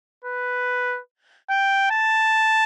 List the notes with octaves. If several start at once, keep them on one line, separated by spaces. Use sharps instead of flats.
B4
G5
A5